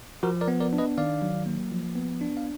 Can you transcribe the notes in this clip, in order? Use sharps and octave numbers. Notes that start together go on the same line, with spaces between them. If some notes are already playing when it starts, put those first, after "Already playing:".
F3 F#4 A#4
A#4 D5
B3
A#4 D5
D4
B4 D#5
D#3 D5 F5
F#3
A#3
F3
B3
D4
F5